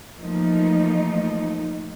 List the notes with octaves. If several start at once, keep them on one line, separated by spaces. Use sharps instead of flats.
E3 F3 A3 A#3 D#4